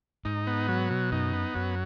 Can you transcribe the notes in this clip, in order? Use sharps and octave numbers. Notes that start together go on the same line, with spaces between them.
G#2 D#4
B3
F#3
B2
F#2 D#4
B3
F#2 F#3